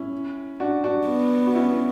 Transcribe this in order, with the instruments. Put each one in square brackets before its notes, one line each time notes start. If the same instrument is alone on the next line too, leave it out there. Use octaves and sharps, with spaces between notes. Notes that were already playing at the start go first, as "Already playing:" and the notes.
Already playing: [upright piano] C#4 E4
D4 F#4
D4 F#4
[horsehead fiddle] B3
[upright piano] F#4
C#4 E4